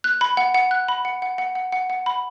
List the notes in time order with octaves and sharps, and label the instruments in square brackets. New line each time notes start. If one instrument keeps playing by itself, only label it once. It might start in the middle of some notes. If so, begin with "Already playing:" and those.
[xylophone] F#6
B5
F#5
F#5
F#6
B5
F#5
F#5
F#5
F#5
F#5
F#5
B5